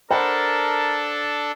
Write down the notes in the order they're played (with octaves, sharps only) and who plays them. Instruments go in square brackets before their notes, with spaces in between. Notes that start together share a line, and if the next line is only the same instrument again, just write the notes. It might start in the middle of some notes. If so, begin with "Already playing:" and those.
[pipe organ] D4 A4 [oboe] A#4 [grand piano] C5 F#5 B5